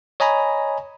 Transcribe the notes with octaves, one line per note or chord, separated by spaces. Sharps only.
C#5 D#5 G#5 A#5 B5 A#6